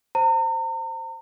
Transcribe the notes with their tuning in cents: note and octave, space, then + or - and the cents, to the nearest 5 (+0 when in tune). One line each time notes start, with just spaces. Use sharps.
C5 +0 A#5 -40